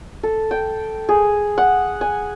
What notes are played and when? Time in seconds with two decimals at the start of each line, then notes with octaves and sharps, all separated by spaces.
0.23 A4
0.51 G5
1.09 G#4
1.58 F#5
2.01 G#5